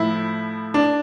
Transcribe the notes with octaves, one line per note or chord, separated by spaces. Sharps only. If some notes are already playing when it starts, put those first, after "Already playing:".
Already playing: A2 F3 E4
D4